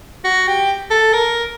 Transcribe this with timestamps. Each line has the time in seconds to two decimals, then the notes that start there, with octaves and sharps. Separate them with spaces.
0.24 F#4
0.47 G4
0.90 A4
1.13 A#4